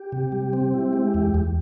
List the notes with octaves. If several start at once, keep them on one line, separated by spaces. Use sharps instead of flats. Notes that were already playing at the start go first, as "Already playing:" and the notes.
Already playing: G4
C3
G3
C4
E4
G#3
E2
E2